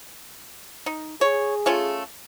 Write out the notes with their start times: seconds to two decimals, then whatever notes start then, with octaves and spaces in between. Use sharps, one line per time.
0.86 D#4
1.21 G#4 C#5
1.66 A3 C#4 F4